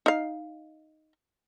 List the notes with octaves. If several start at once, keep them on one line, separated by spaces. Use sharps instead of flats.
D#4 F5